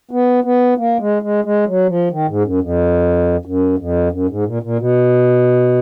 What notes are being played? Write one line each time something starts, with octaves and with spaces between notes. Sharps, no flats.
B3
B3
A#3
G#3
G#3
G#3
F#3
F3
D#3
G#2
F#2
F2
F#2
F2
F#2
G#2
A#2
A#2
B2